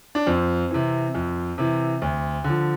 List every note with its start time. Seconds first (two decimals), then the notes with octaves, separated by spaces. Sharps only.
0.15 D4
0.27 F2 C4
0.71 C3 E3
1.14 F2
1.58 C3 E3
2.02 D2
2.44 D3
2.49 F3